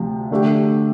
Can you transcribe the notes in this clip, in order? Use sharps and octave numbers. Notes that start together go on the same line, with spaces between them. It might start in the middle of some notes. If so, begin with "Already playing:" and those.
Already playing: D2 C3 F3
D3 A3 D4 G4